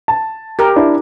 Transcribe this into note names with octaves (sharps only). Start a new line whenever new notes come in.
A5
G4 A#4
D4 E4 E5